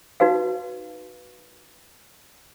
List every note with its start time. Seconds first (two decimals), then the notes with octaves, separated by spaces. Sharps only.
0.20 D#4 F#4 B4 F5